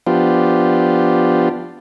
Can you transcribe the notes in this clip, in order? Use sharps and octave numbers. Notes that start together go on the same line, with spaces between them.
F3 B3 D4 F4 G4